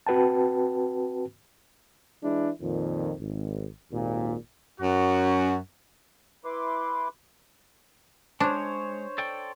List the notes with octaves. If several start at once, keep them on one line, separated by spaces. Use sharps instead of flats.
C4 F#4 B4 G5 A5
E3 G#3 D4 E4
F2 A#2 D#3
G#1
G#1 D#2 A#2
F#2 F#4
E4 B4 C6 D6
G#3 D4 C5 C#5
A4 D5 G5